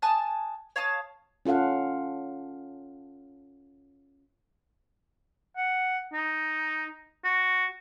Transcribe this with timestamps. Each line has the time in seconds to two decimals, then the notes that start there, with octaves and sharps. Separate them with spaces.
0.02 G#5 A5 D#6 F#6
0.76 C#5 F5 A5 D#6
1.45 C#4 F4 A4 F5 F#5
5.57 F#5
6.13 D#4
7.25 F#4